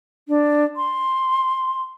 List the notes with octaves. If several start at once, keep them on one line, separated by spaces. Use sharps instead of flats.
D4
C6